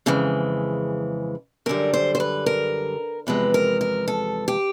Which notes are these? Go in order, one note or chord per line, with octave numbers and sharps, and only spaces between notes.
F2 C#3 E3 G#3
F#2 D3 G3 A#4
C5
C5
B4
A#4
E2 C3 F3 G#3 B4
A#4
A#4
A4
G4